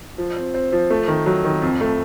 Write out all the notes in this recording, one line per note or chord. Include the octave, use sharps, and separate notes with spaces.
F3
C4
C4
F3
A3
D#3
F#3
D#3
F2
A3